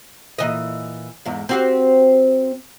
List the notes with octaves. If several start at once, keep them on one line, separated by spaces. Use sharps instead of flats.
A#2 E3 D#5
E2 G#2
C4 F#4 G4